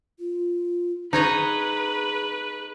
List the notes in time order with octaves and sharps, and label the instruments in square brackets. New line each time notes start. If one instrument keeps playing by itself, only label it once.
[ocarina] F4
[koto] D#4 C#5 D#5 [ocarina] G#4 [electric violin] B4